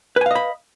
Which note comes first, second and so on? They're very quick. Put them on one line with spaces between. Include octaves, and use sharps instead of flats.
B4 G#5 F5 D#5 B5